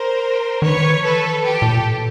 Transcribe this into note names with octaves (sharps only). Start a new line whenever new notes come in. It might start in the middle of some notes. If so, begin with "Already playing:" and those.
Already playing: A#4 C5
D#3 B4 C#5
F3
E3 A4 B4
G4 A4
A#2
B2
A#2